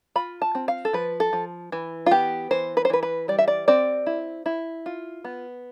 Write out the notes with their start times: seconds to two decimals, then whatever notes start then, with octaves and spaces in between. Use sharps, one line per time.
0.16 F4 B5
0.42 A5
0.55 C4
0.68 F5
0.85 A4
0.93 F3 B4
1.20 A4
1.33 F3
1.72 E3
2.06 F4
2.11 B3 G4
2.51 E3 C5
2.77 B4
2.85 C5
2.90 E3 B4
3.03 B4
3.28 G3 D5
3.38 E5
3.48 D5
3.68 C4 D5
4.06 E4
4.46 E4
4.86 F4
5.24 B3